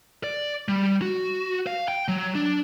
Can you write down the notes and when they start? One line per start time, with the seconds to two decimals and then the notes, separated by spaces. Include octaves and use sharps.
0.24 D5
0.68 G3
1.02 F#4
1.67 F5
1.88 G5
2.08 F#3
2.35 D4